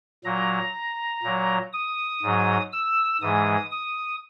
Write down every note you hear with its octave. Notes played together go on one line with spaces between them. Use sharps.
A#2 F#3 A#5
A#2 F#3
D#6
G#2 F#3
E6
G#2 E3 G#3 D#6
D#6